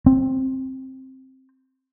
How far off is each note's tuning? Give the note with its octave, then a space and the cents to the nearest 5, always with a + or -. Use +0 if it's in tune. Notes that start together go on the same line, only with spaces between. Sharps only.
C4 +10